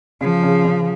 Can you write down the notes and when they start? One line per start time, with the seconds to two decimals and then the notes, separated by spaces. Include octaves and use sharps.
0.21 C#3 F3
0.43 C#3
0.65 C#3